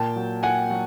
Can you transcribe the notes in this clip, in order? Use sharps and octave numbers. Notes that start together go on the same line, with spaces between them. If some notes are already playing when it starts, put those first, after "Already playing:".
Already playing: A#2 G5 A5
F#3
A#2 F#5 G#5
F#3